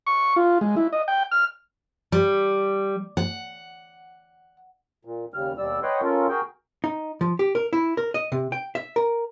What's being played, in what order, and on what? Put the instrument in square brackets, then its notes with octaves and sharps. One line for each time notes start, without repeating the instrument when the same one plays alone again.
[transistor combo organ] C#6
F4
G#3
E4
D#5
G5
F6
[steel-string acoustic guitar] G3
F#5
[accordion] A#2
D#2 C#3 G3 F6
D#2 B2 G3 D5 E6
B4 C#5 D#5 F#5 G5 C6
C#4 F4 A4 A#4
F#4 G#4 A#4 G5
[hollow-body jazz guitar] D#4
F3
G4
A#4
E4
A#4
D#5
C3
G5
E5
A#4